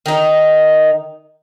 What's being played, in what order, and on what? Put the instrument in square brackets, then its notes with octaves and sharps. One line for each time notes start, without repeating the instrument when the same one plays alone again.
[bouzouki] D#3 D#4